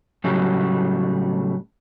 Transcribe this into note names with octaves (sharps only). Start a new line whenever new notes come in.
A2 C#3 F#3 G3 A3